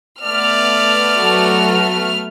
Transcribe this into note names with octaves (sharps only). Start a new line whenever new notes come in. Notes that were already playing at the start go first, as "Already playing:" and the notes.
A3 B3 D5 F6
F#3 F#4 A4